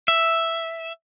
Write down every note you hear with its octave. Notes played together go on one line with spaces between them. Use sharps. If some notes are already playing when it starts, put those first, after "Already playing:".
E5